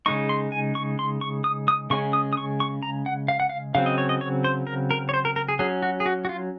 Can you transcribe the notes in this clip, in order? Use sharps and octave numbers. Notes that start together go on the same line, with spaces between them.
C#3 G#3 D#4 C#6
C6
G#5
C#6
C6
C#6
D#6
D#6
C#3 G#3 C#4 C#6
D#6
D#6
C#6
C#6
A#5
F#5
F5
F#5
F5
C#3 F#3 C4 F5
D#5
C#5
D#5
C#5
C5
A#4
A#4
C#5
C5
A#4
A#4
G#4
F#3 C#4 G#4
F#4
G#4
F#4
F#4
F4